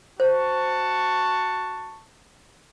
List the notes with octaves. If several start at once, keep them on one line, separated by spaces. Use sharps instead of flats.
F#4 C5 A5 C#6